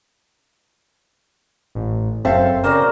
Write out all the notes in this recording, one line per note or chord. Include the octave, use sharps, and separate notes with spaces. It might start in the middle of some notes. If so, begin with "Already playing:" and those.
A1
F#1 C4 A4 C5 E5 F5
C#3 F#4 A#4 C5 D5